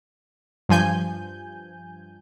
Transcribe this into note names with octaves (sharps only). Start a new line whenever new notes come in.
G2 F3 G#5 G6